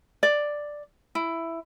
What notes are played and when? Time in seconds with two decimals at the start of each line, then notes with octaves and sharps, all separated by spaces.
0.23 D5
1.15 E4